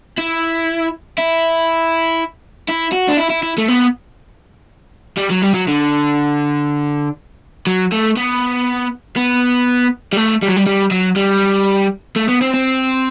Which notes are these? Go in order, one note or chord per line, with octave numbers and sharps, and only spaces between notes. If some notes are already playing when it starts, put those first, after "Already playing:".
E4
E4
E4
F#4
D4
E4
E4
E4
A3
B3
G3
F#3
G3
F#3
D3
F#3
A3
B3
B3
G3
A3
G3
F#3
G3
G3
F#3
G3
A3
B3
C4
C4